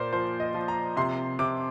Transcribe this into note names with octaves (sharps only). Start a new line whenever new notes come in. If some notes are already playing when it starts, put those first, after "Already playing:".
Already playing: A#2 A#3 C5 D5
F3 C5
D#5
F3
A#5
C3 C6
C3 D6